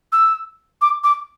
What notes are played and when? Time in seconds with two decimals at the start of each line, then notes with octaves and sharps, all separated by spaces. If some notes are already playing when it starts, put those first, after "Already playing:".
0.12 E6
0.82 D6
1.04 D6